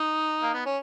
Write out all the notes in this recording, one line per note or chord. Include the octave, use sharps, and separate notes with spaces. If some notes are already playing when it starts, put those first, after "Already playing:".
Already playing: D#4
A#3
B3
C#4